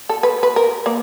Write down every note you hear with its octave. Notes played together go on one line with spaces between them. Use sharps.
A4
B4
B4
A#4
A#3